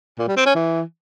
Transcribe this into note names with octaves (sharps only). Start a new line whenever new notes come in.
A#2
G3
C4
C#4
E3